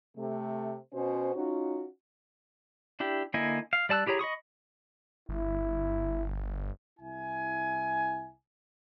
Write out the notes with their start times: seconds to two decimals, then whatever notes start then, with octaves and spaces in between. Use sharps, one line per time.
0.17 C3 A3
0.94 B2 C#4 F#4 C5
1.35 C#4 D#4 F4 F#4
3.00 D4 E4 G4
3.34 D3 A#3 E4 D#5 G#5
3.73 F5
3.89 G3 D5 A5 E6 F#6
4.06 E4 G4 G#4 C#5 A#5
4.19 D#5 B5 C#6 D#6
5.29 G1 E4
7.00 C2 E4 G#5